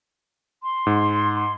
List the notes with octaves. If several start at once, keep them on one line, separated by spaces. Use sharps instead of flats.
C6
G#2